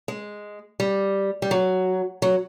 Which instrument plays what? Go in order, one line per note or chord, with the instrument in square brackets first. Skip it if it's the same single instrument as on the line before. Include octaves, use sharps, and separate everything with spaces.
[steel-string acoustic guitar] G#3
G3
G3
F#3
F#3